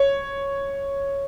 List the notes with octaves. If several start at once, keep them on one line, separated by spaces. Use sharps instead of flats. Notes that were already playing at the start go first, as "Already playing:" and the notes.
Already playing: C#5